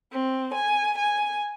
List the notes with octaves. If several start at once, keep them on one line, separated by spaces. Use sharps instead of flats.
C4
G#5
G#5